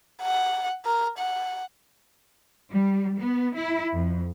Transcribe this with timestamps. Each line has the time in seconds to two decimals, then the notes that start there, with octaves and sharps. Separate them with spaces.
0.23 F#5
0.85 A#4
1.18 F#5
2.74 G3
3.18 B3
3.55 E4
3.94 F2